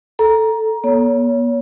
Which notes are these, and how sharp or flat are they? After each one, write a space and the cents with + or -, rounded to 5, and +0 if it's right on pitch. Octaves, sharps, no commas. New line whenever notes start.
A4 +0 A#5 +15
B3 -45 C#5 +25